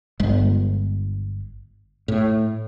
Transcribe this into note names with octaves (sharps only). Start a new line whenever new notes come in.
G1 G#3
A2